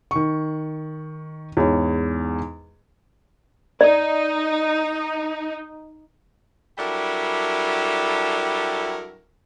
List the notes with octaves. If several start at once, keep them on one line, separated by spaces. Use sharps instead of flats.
D#3 C#6
E2 G#2 C#5
D#4 D5
F#3 G3 D4 E4 A4 A#4